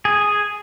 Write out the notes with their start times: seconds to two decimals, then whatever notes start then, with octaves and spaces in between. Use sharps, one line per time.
0.05 G#4